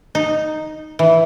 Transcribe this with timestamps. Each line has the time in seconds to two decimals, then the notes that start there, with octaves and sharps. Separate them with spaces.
0.15 D#4
0.99 E3